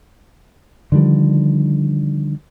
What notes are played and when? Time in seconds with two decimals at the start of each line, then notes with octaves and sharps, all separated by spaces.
0.92 D3 D#3 F3 G3